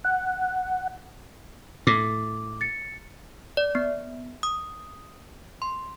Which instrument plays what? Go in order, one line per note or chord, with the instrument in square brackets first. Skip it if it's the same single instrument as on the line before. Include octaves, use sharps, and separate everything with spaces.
[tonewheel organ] F#5
[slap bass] A2 [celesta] D6
[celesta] A6 C#7
[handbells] D5
B3
D#6
C6